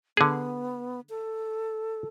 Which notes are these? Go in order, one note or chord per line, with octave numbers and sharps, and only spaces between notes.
D3 B3 G#4
A4